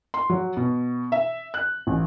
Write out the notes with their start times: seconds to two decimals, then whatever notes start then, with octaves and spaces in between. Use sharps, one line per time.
0.14 C6
0.30 F#3
0.57 B2
1.12 E5
1.54 F#6
1.87 A1